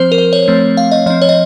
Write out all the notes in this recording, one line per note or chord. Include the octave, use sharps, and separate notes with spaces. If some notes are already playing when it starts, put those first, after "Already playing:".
Already playing: F3 C4 C5
A#4
C5
C#5
F3 A3 C4
F5
D#5
F3 C4 D#5
C#5
D#5